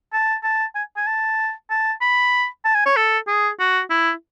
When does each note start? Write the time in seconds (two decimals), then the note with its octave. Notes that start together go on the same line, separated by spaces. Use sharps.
0.13 A5
0.43 A5
0.75 G#5
0.97 G#5
1.07 A5
1.70 A5
2.01 B5
2.65 A5
2.75 G#5
2.86 C#5
2.96 A4
3.27 G#4
3.59 F#4
3.90 E4